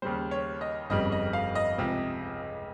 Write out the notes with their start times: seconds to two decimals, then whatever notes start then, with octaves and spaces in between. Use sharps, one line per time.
0.02 D#2 C#3 G3 C5
0.31 C#5
0.61 D#5
0.90 G1 F2 C#3 G3 D#5
1.12 D#5
1.33 F5
1.55 D#5
1.78 C#2 C3 F3